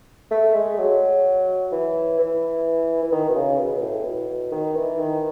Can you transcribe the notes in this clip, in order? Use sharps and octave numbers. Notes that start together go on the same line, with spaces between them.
A3
G#3
F#3
E3
E3
E3
D#3
B2
C#3
B2
B2
A2
B2
D#3
E3
D#3